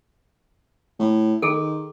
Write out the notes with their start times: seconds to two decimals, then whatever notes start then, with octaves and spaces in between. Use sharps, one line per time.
0.99 A2
1.42 D#3 G#4 A4